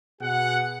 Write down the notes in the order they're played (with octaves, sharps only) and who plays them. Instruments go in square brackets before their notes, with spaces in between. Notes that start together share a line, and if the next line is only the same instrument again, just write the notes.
[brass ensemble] B2 G#4 F#5